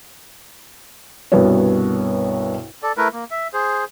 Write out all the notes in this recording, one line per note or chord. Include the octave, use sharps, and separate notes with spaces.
C2 G2 B2 B3 F#4 C#5
A4 D5
A3 E4 A#4 B4
A#3
E5
G#4 C5